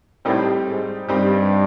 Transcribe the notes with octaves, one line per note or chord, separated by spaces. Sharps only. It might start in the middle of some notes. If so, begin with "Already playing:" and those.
A2 G3 C4 D#4 G4
G#2
G2 G3 C4 D#4 G4